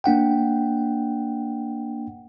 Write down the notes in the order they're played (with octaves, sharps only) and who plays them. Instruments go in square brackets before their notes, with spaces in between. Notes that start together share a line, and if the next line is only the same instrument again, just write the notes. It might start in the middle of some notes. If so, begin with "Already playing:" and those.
[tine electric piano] A#3 D4 F#5 G5